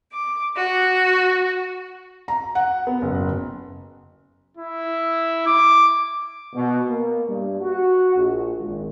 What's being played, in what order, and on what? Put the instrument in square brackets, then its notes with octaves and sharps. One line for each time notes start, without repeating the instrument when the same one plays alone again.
[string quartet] D6
F#4
[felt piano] A#5
F#5
B3
F#1
[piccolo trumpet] E4
D6
[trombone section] B2
A#3
G2
F#4
A#1
G#1